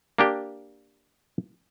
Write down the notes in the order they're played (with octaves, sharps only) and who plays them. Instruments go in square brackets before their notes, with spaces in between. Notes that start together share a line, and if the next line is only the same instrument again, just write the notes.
[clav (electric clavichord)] A#3 D4 G4